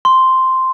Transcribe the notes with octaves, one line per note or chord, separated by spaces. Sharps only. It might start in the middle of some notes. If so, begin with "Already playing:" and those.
C6